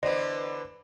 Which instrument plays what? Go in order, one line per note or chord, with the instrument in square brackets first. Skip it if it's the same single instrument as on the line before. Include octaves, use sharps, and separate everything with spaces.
[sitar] D3 E3 B3 [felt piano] C5 [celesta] D5 D#5 A#6